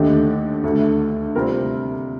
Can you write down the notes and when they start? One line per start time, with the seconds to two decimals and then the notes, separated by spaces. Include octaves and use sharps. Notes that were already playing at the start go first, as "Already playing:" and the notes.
Already playing: D#2 D3 A3 D#4 G4
0.64 D2 D3 A3
1.35 C3 G3 C4 F4 A#4